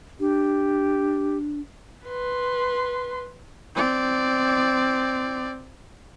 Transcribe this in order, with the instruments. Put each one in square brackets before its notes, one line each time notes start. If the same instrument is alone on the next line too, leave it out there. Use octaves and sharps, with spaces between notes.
[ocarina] D4 [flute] G4
[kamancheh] B4 C6
[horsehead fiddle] C4 D5